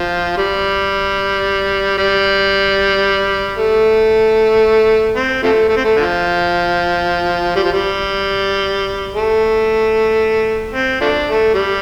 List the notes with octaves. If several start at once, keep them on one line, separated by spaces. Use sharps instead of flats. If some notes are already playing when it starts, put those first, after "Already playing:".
Already playing: F3
G3
G3
A3
C4
C3 F3 A3
A3
C4
A3
D3 F3
G3
F3
G3
A3
C4
F3 A3 D4
A3
G3